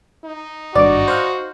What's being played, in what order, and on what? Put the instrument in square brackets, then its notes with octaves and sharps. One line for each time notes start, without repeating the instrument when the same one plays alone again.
[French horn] D#4
[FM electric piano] G#1 G2 D6 [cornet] F#4 [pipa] D5
[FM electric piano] C5 F5 F#5